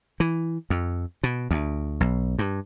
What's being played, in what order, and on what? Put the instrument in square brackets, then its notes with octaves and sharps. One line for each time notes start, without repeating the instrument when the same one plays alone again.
[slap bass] E3
F2
B2
D2
B1
G2